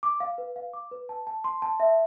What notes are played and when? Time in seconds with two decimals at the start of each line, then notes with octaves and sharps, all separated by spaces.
0.03 D6
0.20 F5
0.38 B4
0.56 F5
0.73 D6
0.91 B4
1.09 A5
1.27 A5
1.44 C6
1.62 A5
1.80 E5